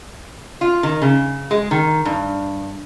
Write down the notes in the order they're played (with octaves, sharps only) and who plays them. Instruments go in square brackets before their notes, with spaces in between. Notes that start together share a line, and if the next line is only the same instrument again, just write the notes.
[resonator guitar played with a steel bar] F4
D#3
C#3
G#3
D#3
G2